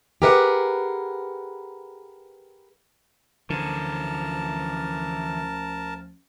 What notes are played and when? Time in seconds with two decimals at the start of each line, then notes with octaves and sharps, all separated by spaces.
0.22 G4 G#4 A#4 B4 F5 F#5
3.50 D2 D3 E3 F3 C#4 A#4 C5 A5